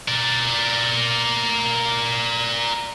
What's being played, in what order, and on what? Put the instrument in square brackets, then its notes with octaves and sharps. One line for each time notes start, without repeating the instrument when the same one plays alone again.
[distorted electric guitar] A#4 D5